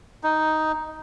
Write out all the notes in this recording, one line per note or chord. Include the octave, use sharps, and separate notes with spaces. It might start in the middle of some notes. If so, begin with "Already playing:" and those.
D#4